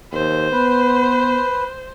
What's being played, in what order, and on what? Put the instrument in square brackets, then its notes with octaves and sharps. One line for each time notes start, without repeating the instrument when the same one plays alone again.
[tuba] D#2 [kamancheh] C5
[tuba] B3 [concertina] B4